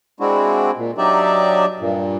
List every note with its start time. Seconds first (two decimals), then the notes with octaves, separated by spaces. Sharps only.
0.20 G#3 C4 D4 E4 F#4
0.77 A#2
0.98 F#3 D4 D#4 G4 D5 E5
1.80 G2 A#2